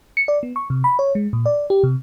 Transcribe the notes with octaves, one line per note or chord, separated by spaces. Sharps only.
C#7
D5
B3
C#6
C3
B5
C#5
G#3
A#2
D5
G4
C3